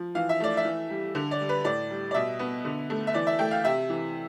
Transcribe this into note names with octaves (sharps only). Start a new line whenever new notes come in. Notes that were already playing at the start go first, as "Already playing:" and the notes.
Already playing: F3
E3 F5
E5
A3 D5
E5
E3
G3
D3
D5
G3
B4
A2 D5
G3
D5
B2 E5
B3
D3
A3
E5
E3 D5
E5
A3 G5
F5
C3 E5
E3